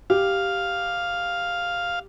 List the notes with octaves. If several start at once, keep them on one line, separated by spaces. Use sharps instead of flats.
G4 F5